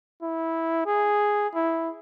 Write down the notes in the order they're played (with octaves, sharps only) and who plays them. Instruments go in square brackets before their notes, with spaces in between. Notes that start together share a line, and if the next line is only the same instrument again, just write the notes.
[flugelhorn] E4
G#4
E4